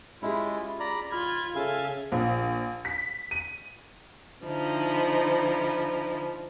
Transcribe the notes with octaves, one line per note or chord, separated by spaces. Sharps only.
G#3 C#4 E4 F4 G4 G#4
D5 A#5 B5
D#2 F4 B5 F6 G#6
C#3 A4 E5 F5 G#5
A#1
B6
D#7
D3 F3 D#4 E4